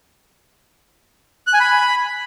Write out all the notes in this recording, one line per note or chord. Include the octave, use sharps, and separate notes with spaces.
F#6
G#5
B5